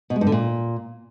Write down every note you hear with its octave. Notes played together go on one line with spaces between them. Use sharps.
B2
G#3
G2
D3
A#2